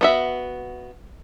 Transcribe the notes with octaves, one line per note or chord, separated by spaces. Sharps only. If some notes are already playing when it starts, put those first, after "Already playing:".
B3 F#4 E5